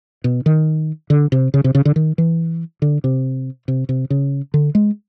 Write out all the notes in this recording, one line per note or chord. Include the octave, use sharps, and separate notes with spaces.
B2
D#3
D3
C3
C#3
C3
C#3
D3
D#3
E3
D3
C3
C3
C3
C#3
D3
G#3